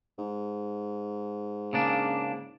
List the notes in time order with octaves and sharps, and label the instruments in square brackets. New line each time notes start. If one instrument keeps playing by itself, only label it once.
[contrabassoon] G#2
[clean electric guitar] C#3 A#3 D4